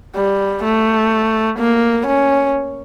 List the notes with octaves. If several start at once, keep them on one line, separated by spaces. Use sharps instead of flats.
G3
A3
A#3
C#4